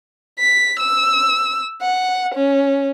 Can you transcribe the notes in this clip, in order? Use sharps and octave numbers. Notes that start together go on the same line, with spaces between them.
B6
E6
F#5
C#4